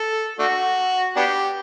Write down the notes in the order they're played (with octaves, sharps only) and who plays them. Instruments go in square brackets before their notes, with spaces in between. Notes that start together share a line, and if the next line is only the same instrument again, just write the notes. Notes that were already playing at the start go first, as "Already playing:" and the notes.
Already playing: [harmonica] A4
A3 D4 F#4
B3 D4 G4